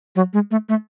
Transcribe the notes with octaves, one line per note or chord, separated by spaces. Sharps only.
F#3
G#3
A3
A3